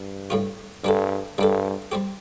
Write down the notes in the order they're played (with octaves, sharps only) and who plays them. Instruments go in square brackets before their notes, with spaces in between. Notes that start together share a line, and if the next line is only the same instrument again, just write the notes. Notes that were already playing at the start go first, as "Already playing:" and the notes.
Already playing: [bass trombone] G2
[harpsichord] A2 G3 F4
[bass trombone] G2 [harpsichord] G3 D4 A4
[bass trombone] G2 [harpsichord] G3 D4 A4
[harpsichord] G3 C4 G4